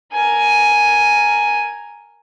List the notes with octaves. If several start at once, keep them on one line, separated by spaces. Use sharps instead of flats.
A#4 G#5